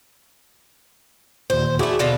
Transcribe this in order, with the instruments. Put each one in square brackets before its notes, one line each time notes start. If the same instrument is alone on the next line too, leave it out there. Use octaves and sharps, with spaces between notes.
[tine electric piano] D#2 A#2 [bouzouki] C5
[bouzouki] A3 E4 [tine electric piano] F#4 G#4 D6
[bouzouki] B2 D3 F4